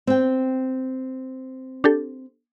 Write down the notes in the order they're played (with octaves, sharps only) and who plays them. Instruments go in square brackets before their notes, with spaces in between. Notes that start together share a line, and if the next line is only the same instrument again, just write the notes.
[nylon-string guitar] C4 G5
[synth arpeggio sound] D4 G4 A4